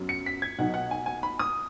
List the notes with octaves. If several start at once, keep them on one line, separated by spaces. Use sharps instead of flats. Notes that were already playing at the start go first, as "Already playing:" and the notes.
Already playing: F#2 F#3 B3
C#7
B6
G#6
B1 B2 F#3 D#4 F#5
F#5
G#5
G#5
B5
D#6